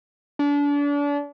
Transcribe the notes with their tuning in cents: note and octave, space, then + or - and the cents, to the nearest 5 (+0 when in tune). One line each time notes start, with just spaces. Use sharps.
D4 -35